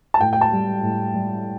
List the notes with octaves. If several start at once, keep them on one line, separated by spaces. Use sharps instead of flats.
A5
A2 G5
G5
A5
G3
A2
G3